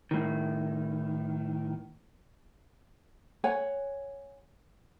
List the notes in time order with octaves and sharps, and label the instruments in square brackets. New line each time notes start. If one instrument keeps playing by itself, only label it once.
[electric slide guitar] A2 D#3
[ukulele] C#5 F#5 G#5